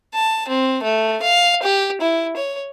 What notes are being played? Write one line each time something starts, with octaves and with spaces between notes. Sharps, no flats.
A5
C4
A3
F5
G4
E4
C#5